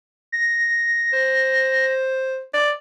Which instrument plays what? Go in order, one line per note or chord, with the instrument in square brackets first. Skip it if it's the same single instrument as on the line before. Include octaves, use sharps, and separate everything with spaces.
[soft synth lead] A#6
[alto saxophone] C5
D5